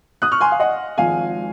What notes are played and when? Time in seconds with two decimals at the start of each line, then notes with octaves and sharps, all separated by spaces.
0.22 D#6 F#6
0.32 C#6 F6
0.41 G#5 C6
0.52 F5
0.60 D#5 F#5
0.98 G#1 G#2 F3 F5 G#5